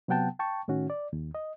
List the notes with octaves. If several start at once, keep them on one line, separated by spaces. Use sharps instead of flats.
C3 F#3 B3 F#5 G5 A5
G5 A5 C#6
A2 D#3 C#4 F#4
D5
D#2
D#5